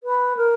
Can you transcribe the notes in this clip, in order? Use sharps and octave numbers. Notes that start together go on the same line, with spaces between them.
B4
A#4